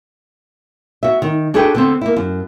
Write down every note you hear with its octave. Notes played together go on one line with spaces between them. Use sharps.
F#4 E5
D#3
D4 F#4 G#4 A4 B4 G5
D3 B3 C4
A#3 E4
F#2